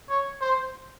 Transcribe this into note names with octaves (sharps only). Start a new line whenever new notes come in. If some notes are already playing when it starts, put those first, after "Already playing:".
C#5
C5